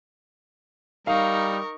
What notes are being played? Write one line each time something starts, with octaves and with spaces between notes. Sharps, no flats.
G3 D#4 A#4 F5 C#6